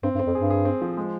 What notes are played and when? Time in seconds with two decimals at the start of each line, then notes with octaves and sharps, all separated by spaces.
0.03 G2 C4
0.15 G2
0.19 C4
0.27 F2
0.35 G2 G#4
0.50 G#4
0.65 C4
0.81 F3
0.97 G#3